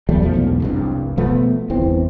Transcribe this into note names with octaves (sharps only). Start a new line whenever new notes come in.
E2 F#3 G3 A3
B1 A#2 F3 A3
E1 B1
F1 C2 G2
B2 F3 A3 B3
G1 E2 E3 C4